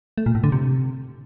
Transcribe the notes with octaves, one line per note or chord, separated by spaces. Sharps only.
A3
A#2
A2
D3
C3